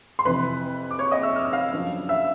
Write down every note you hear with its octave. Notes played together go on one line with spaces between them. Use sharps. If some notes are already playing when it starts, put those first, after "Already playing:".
C6
F2 C3 E3 B4 B5
D6
C#5 C#6
D#5 D#6
E5 E6
F6
E6
F5 F6
F#2 D3 F3
E5 E6